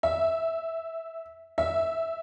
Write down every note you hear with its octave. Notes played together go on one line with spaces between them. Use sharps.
E5
E5